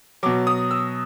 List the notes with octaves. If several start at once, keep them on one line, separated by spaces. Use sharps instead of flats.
B2 F#3 D6
D#6
E6